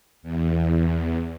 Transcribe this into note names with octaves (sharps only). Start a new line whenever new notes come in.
E2